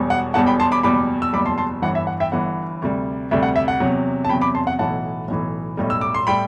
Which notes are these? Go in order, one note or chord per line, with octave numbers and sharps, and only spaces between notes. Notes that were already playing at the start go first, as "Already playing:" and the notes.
Already playing: E1 E2 B2 G3
F#5
E1 E2 B2 G3 F#5 A5
G5 B5
A5 C6
B5 D6
F#1 E2 B2 G3 B5 D6
E6
F#1 E2 B2 G3 B5 D6
A5 C6
A5 C6
G1 G2 E3 F#5
E5
F#5
E5 G5
G1 G2 E3 F#5
D2 C3 G3
D2 C3 G3 E5
F#5
E5
F#5
E2 C3 F#3
A5
E2 C3 F#3 G5 B5
B5 D6
A5 C6
F#5
B1 A2 E3 F#5 A5
B1 A2 E3
B1 A2 G3
E6
D6
C6
A2 G3 G5 B5